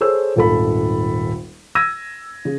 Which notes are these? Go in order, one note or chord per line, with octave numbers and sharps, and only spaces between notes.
G#4 A4 C5 C#5 E6
D#1 G#1 A4 B5
E6 G#6 A#6 D#7
C#3